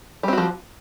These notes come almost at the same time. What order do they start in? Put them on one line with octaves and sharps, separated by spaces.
G3 C4 F#4 F3